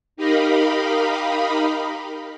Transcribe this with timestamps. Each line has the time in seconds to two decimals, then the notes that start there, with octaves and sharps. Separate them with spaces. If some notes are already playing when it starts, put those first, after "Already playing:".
0.17 D#4 G4 A#4 D#5 F5 B5